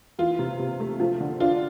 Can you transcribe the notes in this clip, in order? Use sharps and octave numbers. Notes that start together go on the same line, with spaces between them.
E3 F4
C3
C3
A3
F3
D3
D4 F4